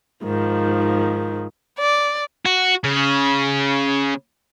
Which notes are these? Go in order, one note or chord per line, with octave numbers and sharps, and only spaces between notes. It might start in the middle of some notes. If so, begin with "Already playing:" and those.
G#2 D#3 F3
D5
F#4
C#3